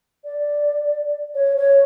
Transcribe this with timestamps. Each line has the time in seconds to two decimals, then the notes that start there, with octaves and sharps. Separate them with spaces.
0.24 D5
1.35 C#5
1.57 C#5